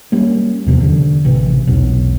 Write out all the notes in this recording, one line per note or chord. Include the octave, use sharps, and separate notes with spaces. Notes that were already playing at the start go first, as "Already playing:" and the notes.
G3 A#3 C#4
E2 C3 F3
D3
A1 C3 E3
B1 E2 B2 F#3